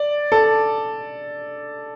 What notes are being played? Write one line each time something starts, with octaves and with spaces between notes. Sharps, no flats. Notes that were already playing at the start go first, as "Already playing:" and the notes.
Already playing: D5
A4